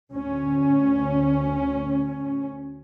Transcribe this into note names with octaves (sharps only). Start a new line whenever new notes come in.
D2 C#4